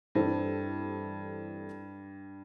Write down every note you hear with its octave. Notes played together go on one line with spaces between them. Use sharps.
G2 E3 G3 C4 E4 A4